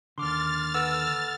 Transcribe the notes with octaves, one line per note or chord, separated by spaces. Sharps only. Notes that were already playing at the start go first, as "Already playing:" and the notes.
D#2 D3 C6 D6 F6 A6
A4 B4 F#5 E6